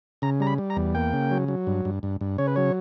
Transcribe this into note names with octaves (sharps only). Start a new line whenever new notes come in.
C#3 A#5
G3 A#5
B5
G3
A#5
E2
A#3 G5
C#3
F#3
F#3
G2
G2
G2
G2
C#3 C#5
B4
F#3 C#5